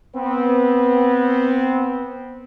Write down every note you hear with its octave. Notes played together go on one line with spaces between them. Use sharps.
B3 C4